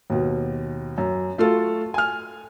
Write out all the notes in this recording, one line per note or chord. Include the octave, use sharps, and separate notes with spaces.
D#2 B2
F#2
A3 F4 F#4 A4
G#5 F6